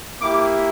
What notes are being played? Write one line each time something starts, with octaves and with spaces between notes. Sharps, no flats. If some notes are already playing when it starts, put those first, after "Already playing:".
A#3 E4 G4 D6